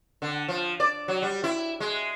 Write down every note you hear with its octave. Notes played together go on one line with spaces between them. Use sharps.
D3
F3
D5
F#3
G3
E4
G#3